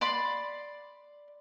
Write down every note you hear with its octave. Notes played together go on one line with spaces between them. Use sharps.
D5 B5 C6